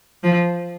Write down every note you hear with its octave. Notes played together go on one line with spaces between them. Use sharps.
F3